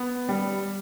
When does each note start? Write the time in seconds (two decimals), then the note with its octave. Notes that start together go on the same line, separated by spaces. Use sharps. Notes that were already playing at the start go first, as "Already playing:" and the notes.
Already playing: B3
0.29 G3